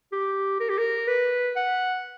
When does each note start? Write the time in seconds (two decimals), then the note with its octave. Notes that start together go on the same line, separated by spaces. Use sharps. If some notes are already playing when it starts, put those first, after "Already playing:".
0.12 G4
0.60 A#4
0.69 G4
0.78 A#4
1.08 B4
1.56 F#5